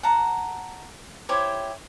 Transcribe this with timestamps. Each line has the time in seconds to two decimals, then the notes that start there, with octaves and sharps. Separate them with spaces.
0.03 F#5 A5 A#5
1.29 E4 G4 C5 C#5